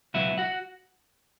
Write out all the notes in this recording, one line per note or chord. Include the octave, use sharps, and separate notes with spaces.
C#2 B2 F#3 B3 E4 E5
F#4 F#5